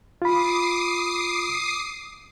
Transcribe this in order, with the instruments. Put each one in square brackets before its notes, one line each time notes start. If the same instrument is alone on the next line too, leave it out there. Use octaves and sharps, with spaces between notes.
[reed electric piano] F4 B5 [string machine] D6 D#6 C7